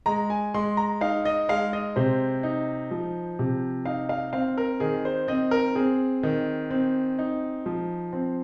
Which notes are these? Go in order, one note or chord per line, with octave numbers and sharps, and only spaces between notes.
G#3 A#5
G#5
G#3 C6
A#5
D#4 F5
D#5
G#3 F5
D#5
C3 C5
D#4
F3
C3
D#4 F5
F5
C4 F5
A#4
D#3 G#4
C5
C4 D#5
A#4
C4 G#4
D#3
C4
D#4
F3
C4